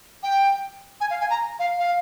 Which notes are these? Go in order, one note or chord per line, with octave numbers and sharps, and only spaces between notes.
G5
G#5
F5
G#5
A#5
F5
F5